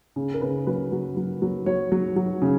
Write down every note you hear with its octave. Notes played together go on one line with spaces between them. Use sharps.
C#3
A#4
C#3 B4
F#3 B4
F#3
F#3
F#3
F#3 C#5
F#3
F#3
C#3